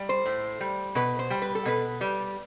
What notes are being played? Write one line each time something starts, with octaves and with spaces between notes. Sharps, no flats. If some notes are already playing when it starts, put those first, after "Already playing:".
Already playing: G3
C5
A2
G3
B2 B4
C5
G3
B4
A4
B2 B4
G3